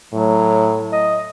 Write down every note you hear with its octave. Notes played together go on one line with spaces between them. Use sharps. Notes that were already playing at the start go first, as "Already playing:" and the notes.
A2 F#3
D#5